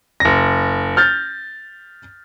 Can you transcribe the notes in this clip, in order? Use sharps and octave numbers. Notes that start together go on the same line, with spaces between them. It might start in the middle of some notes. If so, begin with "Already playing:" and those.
F#1 A#6
F6 G6 A6